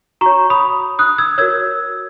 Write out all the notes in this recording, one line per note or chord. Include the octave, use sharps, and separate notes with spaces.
F#4 C#5 A#5 C#6
B5 D#6
D#6 F#6
E6 G#6
F#4 A#4 C#5 E6 G#6